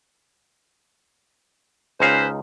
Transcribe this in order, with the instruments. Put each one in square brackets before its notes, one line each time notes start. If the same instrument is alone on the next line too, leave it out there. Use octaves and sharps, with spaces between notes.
[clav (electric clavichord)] C#2 D#4 F5 [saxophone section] C#4 B4 C5